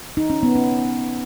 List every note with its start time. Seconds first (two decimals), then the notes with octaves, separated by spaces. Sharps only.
0.17 D#4
0.30 C#4
0.43 B3
0.56 C#4